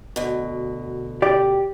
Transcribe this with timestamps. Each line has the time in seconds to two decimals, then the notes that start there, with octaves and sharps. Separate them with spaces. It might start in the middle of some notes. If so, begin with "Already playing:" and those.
0.16 D2 B2
1.22 G4 D5